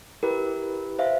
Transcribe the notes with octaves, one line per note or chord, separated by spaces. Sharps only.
E4 G4 A#4 B4
C5 E5 F5